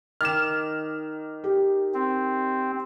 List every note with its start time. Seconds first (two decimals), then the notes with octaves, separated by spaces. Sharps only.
0.21 D#3 D6 F6 E7
1.44 G4
1.94 C4